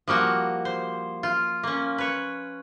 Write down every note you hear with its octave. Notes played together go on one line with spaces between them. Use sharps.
F3 G3 A#3 F#4
C5
F4
A#3 C#4
B4 C#5